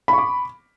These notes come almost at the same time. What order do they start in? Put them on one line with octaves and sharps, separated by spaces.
B5 C#6 D6